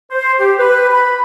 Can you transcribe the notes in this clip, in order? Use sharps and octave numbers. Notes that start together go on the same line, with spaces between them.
C5
G4
B4
B5